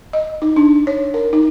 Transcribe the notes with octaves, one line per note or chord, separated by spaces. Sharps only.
D#5
D#4
D4
C#5
A#4
D#4